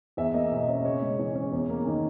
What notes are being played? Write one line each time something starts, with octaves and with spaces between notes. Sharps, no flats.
E2 E5
A#3 D#5
B2
C#4
C#3 C#5
G#3
E3
C#4
E2
A#3
D#3